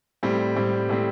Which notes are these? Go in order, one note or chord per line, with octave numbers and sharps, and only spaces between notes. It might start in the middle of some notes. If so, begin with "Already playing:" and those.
A2 G3 C4
A2 G3 C4
A2 G3 C4